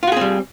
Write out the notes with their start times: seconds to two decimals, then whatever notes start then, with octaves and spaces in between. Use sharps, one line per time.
0.03 F4
0.07 F#4
0.12 G#4
0.17 C4
0.21 G3